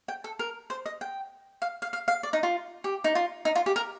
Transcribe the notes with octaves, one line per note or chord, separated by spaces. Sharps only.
G5
A4
A#4
C5
D#5
G5
F5
F5
F5
F5
D5
D#4
F4
G4
D#4
F4
D#4
F4
G4
A#4